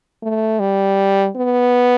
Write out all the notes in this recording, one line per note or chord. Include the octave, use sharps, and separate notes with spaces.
A3
G3
B3